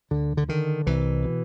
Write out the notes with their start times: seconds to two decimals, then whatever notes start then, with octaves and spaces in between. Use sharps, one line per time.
0.11 D2 D3
0.37 D3
0.49 D3 D#3
0.87 C2 E3
1.24 B2